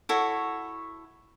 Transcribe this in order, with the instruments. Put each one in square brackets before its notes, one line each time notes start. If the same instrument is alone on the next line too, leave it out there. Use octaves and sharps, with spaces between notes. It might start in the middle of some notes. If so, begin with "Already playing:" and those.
[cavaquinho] E4 F#4 A4 C#5